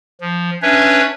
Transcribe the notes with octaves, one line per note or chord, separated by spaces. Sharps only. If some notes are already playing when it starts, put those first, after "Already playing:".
F3
C#4 D4 B4 C#5 E5